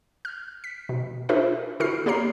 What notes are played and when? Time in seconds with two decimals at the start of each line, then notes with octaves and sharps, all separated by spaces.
0.25 F6
0.64 B6
0.89 B2
1.29 D4 F4 G#4 A#4 C5 E5
1.80 D3 E4 F#4 A4 F6 C7
2.06 A#3 G4 C#5 A#5 C7